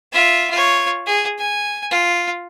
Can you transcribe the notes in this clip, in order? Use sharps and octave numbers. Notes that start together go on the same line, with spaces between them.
F4 E5
F4 C#5
G#4
G#5
F4